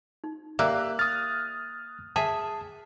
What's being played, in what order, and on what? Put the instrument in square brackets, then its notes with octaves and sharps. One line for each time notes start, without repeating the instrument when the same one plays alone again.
[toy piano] D#4
[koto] A#3 [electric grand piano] G4 E6 F#6 [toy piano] D5 E5
[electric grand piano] D#6 F6 [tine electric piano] A6
[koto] G#4 E5 [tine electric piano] A5